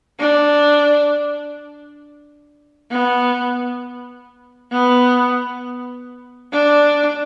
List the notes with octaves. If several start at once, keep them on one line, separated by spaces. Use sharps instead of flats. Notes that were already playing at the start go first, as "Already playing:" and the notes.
D4
B3
B3
D4